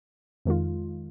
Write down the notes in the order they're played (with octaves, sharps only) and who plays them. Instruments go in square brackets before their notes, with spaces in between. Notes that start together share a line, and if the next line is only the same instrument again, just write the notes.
[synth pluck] F2 D#3 G#3 F4